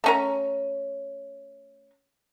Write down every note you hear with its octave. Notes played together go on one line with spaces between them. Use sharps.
A3 C#4 A#5